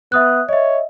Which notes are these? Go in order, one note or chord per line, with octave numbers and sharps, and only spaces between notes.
B3 E5 D#6 F#6
C#5 D#5 E5